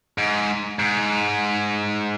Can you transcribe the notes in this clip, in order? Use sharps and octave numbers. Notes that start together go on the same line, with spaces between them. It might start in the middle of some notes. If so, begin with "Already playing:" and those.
G#2
G#2